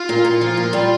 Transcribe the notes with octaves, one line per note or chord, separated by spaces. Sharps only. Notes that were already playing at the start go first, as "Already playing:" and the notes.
Already playing: F4
A#2
A#2
F3
A#2
G3